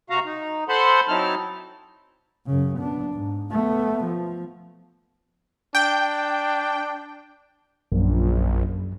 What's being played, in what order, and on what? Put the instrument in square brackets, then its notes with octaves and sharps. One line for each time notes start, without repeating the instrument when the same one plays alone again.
[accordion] C3 F#4 F5 A#5
D#4
A4 C5 F#5 A5 B5 C6
F#3 C4 D#4 E4 A5 F6
[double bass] F#2 C#3
B3 D4
G#2
A3 B3
F3
[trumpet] D4 [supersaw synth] G5
[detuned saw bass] A#1 [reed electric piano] F#2